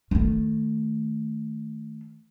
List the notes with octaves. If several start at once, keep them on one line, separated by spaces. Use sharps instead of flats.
D#3 A3